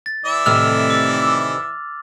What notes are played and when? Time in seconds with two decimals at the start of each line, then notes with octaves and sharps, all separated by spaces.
0.06 A6
0.25 E3 D5 E5
0.46 A2 C3 D#3 E6 F6 F7
0.60 E6
0.90 D6 A6